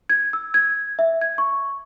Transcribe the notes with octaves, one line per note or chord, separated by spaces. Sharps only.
G#6
E6
G#6
E5
G#6
C#6